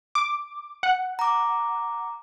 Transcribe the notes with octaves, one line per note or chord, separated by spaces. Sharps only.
D6
F#5
A#5 D6